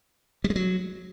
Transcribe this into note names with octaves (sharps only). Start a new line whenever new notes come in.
G3
G#3
F#3